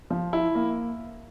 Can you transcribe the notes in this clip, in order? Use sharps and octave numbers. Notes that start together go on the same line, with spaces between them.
F3
E4
A#3